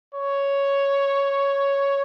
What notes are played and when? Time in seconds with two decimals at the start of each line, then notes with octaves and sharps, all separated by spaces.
0.14 C#5